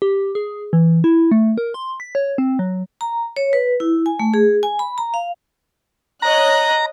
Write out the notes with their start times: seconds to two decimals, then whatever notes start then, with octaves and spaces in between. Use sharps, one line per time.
0.02 G4
0.35 G#4
0.73 E3
1.04 E4
1.31 A3
1.58 A#4
1.74 C6
2.00 B6
2.15 C#5
2.38 C4
2.59 F#3
3.01 A#5
3.36 C#5
3.53 B4
3.80 E4
4.06 G#5
4.19 A3
4.34 G#4
4.63 G#5
4.79 B5
4.98 A#5
5.14 F5
6.22 C#5 D#5 A#5 F#6